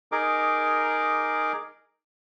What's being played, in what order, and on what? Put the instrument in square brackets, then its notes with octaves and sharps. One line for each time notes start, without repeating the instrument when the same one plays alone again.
[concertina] D#4 G#4 A#4 D6